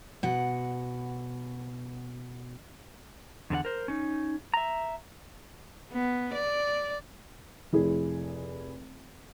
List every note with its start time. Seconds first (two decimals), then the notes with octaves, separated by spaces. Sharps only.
0.23 B2 F#5
3.50 E2 D3 D4 F#5
3.65 A#4 C5
3.88 C#4 D#4
4.54 E5 A#5
5.92 B3
6.34 D5
7.73 F1 E4 G#4